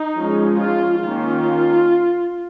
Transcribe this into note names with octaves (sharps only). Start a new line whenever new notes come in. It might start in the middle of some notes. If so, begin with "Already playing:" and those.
Already playing: D#4
F3 G#3 C#4
F4
D#3 A#3 C#4 F4